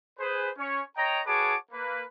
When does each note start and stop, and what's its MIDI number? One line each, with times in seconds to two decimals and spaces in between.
0.19 0.49 68
0.19 0.49 71
0.19 0.49 72
0.57 0.82 61
0.57 0.82 73
0.97 1.20 73
0.97 1.20 75
0.97 1.20 79
0.97 1.20 82
1.26 1.56 66
1.26 1.56 68
1.26 1.56 71
1.26 1.56 73
1.26 1.56 81
1.26 1.56 86
1.72 2.03 58
1.72 2.03 71